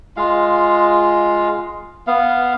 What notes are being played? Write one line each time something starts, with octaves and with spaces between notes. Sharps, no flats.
G#3 F4 F5
B3 F5